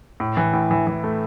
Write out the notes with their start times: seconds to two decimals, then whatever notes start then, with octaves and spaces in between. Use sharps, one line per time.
0.20 A2
0.37 E3
0.53 A2
0.71 E3
0.87 E3
1.04 A3